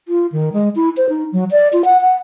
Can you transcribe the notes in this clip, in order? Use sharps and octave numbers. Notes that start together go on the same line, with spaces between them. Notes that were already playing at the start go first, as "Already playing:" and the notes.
F4
D#3
G#3
E4
C5
D#4
F#3
D5
F4
F#5
F#5